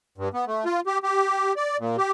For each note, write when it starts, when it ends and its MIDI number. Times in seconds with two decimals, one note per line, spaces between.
0.18 0.29 43
0.34 0.45 59
0.47 0.64 57
0.65 0.80 65
0.87 0.98 67
1.03 1.53 67
1.56 1.77 74
1.80 1.97 46
1.98 2.11 67